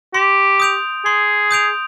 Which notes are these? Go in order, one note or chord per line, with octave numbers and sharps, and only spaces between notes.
G4 C6
D#6 G6 D7 F7
G#4 C6
D#6 G6 D7 F7